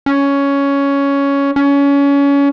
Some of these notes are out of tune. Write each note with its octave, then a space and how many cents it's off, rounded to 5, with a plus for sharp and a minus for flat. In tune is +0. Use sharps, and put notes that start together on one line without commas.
C#4 +10
C#4 +25